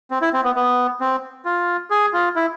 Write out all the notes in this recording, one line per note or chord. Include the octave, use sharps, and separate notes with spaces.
C4
E4
C4
B3
B3
C4
F4
G#4
F4
E4